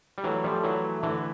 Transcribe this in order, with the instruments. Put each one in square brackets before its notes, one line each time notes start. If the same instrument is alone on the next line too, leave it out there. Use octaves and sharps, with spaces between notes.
[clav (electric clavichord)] G3
[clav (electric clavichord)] E3 F#3 [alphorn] A3
[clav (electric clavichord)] F3 G3
E3 F#3
[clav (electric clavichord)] D3 E3 [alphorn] A3